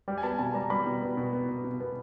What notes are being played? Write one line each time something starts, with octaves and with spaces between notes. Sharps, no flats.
G3 G5
G#5
B3 A5
B2 A5
G3 A#5
G3 B5
B2
B3
B2
B3
B2
B2
B3